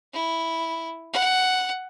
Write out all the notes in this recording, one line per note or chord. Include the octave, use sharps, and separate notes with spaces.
E4
F#5